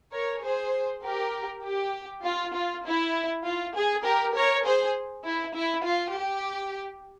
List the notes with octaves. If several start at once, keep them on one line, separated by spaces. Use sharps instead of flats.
A#4 C#5
G#4 C5
G4 A#4
G4
F4
F4
E4
F4
G#4
G4 A#4
A#4 C#5
G#4 C5
E4
E4
F4
G4